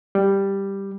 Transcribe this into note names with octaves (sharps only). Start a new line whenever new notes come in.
G3